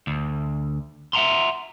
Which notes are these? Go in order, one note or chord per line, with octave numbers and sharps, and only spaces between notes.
D2
E5 F#5 A#5 C6